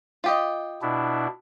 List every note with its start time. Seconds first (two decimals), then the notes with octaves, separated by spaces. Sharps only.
0.24 F4 G4 D#5
0.82 B2 D4 E4